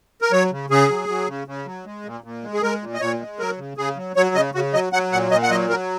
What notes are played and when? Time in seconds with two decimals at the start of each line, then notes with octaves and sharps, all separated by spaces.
0.21 A#4
0.32 F#3 C#5
0.51 C#3
0.70 C#3 G#4
0.90 F#3
1.08 F#3
1.28 C#3
1.47 C#3
1.66 F#3
1.85 G#3
2.05 A#2
2.24 A#2
2.43 G#3
2.53 G#4
2.62 G#3 A#4
2.82 A#2
2.94 D#5
3.01 A#2 C#5
3.20 G#3
3.39 F#3 A#4
3.58 C#3
3.77 C#3 G#4
3.96 F#3
4.16 F#3 C#5
4.35 C#3 D#5
4.54 C#3 F#4
4.74 F#3 D#5
4.93 F#3 F#5
5.12 A#2 F#5
5.31 A#2 D#5
5.43 F#5
5.50 F#3 D#5
5.70 F#3 A#4